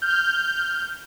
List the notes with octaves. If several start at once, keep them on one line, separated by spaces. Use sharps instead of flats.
F6 G6